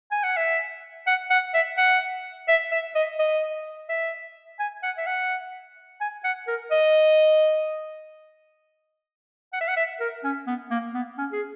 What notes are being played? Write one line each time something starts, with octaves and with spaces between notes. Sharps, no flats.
G#5
F#5
E5
F#5
F#5
E5
F#5
E5
E5
D#5
D#5
E5
G#5
F#5
E5
F#5
G#5
F#5
A#4
D#5
F#5
E5
F#5
E5
A#4
C#4
B3
A#3
B3
C#4
G#4